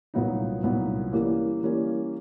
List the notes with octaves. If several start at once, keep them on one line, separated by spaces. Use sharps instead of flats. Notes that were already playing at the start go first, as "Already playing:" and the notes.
C2 A#2 F#3 B3 D#4
C2 A#2 F#3 B3 D#4
E3 G3 A#3 C#4
E3 G3 A#3 C#4